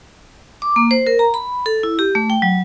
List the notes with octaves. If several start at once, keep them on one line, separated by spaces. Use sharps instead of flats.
D6
A#3
C5
A#4
A#5
B5
A4
E4
G4
A3
G5
F#3